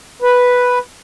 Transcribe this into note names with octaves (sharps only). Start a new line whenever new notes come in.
B4